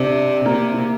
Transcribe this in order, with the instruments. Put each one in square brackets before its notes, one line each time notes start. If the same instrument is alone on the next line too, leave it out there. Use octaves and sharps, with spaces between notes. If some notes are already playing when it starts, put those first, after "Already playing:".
Already playing: [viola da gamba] C3 [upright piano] C4 D4
[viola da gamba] C3 [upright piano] A#3
[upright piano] A#3